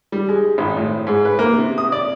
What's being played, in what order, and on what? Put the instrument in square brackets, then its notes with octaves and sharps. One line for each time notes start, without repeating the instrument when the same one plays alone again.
[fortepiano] G3
G#3
G#1
A2
G#2
B4
A#3
C3
D#6
D5